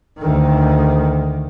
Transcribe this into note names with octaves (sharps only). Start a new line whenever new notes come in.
D2 D#3